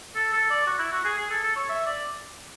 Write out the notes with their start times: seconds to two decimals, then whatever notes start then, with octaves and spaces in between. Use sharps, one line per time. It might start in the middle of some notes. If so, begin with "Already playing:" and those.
0.15 A4
0.33 A4
0.50 D5
0.67 F#4
0.79 E4
0.92 F#4
1.05 G#4
1.18 G#4
1.31 A4
1.43 A4
1.56 C#5
1.69 E5
1.86 D5